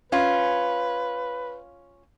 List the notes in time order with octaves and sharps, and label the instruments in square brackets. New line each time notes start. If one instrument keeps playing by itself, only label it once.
[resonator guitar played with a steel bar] C#4 F4 [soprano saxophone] B4